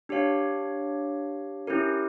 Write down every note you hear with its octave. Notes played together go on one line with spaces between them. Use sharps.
D4 G4 C#5 F5
C#4 E4 G4 A#4